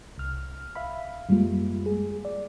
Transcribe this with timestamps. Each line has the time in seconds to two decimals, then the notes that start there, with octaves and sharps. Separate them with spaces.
0.18 C2 F6
0.75 E5 F5 B5
1.29 F#2 G3 G#3 A#3 F4
1.86 G#4
2.25 D5